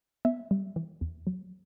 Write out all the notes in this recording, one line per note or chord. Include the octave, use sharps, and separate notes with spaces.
B3 E5
G3
E3
E2
F#3